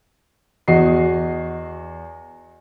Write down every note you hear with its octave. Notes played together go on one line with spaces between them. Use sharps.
E2 F#4 D#5 C7